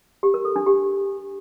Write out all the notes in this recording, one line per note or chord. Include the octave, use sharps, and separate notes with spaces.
G4
A#4
A4
D4
G4